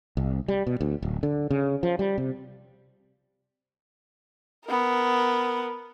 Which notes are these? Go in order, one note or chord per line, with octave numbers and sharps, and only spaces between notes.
C2
G3
B2
D2
D1
D3
C#3
F3
G3
C3
B3 A#4